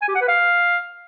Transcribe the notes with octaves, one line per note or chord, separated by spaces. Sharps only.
G#5
G4
F#5
B4
F5